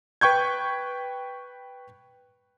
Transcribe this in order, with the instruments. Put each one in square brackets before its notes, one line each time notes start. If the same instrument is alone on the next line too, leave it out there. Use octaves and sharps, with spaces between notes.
[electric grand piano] B4 G5 C#6 G6 G#6